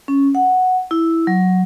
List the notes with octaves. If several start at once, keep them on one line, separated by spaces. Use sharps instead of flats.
C#4
F#5
E4
F#3